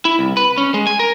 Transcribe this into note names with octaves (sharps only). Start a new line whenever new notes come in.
E4
C2
B4
C#4
G#3
G#5
A#4